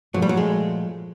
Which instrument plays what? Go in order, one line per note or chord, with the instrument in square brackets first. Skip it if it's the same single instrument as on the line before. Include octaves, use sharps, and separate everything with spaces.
[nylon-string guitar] A#2 F3 A3 [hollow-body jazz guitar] F#3
[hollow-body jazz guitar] G3
F#3
G#3